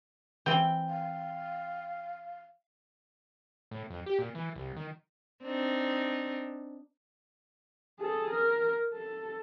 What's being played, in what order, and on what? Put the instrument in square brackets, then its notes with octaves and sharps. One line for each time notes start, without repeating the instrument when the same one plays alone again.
[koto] E3 C4 [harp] G5
[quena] F5
[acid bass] A2
F2
G4
A#2
E3
C2
D#3
[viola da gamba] C4 D4 D#4
[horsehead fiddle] G#4 A4
A#4
A4